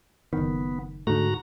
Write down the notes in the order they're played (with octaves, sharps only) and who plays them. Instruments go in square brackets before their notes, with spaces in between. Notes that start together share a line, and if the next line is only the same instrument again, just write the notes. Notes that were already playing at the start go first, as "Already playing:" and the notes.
[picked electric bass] F#1 D#3 [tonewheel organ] B3
[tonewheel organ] G#2 F#4 A#5 [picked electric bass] D3 A3